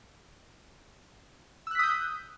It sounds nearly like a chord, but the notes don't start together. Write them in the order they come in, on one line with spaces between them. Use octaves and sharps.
E6 F#6 B6 D#6 G6